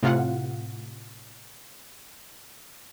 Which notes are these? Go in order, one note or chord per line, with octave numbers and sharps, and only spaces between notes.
A2 C3 F4 F5 F#5